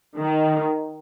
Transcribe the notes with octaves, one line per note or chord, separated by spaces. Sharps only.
D#3